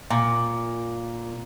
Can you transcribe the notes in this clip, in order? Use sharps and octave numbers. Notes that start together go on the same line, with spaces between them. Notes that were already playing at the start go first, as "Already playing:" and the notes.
A#2